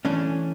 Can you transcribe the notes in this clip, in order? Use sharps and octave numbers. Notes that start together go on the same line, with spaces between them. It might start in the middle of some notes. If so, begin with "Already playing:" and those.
E3 A3 C#4 D4